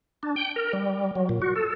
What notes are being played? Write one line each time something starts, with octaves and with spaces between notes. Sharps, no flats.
D4
G5
A#4
G3
F#3
A#2
F#4
A4